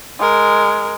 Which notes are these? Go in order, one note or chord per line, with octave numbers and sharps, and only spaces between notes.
G#3 A#4